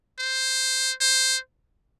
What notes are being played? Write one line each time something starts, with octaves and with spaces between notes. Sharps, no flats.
C5
C5